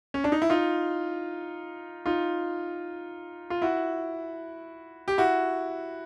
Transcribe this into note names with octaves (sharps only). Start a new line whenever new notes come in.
C#4
D4
D#4
E4
D#4 F4
D#4 F4
F4
E4 F#4
G4
E4 F#4